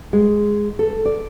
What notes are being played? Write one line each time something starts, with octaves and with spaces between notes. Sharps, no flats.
G#3
A4
D5